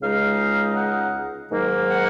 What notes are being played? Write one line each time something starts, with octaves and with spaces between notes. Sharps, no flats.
C#2 C#3 G#3 D#4 F5
F#5
G#2 D#3 F#3 A#3
F#5